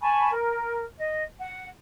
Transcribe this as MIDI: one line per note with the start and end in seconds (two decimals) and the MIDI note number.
0.01 0.30 80
0.01 0.30 81
0.01 0.30 83
0.01 0.30 85
0.32 0.83 70
0.97 1.24 75
1.40 1.68 78